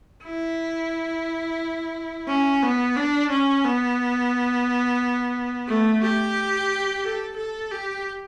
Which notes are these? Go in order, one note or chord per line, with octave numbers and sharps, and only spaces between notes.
E4
C#4
B3
D4
C#4
B3
A3
G4
A4
A4
G4